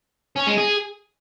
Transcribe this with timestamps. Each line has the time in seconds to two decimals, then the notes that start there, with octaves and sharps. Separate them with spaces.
0.36 C#4
0.47 G#3
0.58 G#4